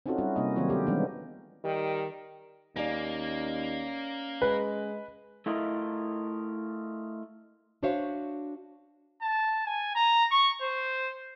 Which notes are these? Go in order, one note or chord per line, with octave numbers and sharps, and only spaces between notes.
C4 C#4 D#4 F4 F#4 A4
G3 C#4 E4 F#4
C3 G3 A#3 C4 D#4 D#5
D#3 F#3 A#3 C4 F4 C#5
B3 C#4 G4 A4
E3 G3 G#3 B3 D4 D#4
D#3 G3
D#2 A#3 C#4 D5
G#3 B4
A3 E4 F4 A#4 D#5
D4 F#4 C5 C#5 E5 F5
A5
G#5
A#5
C#6
C5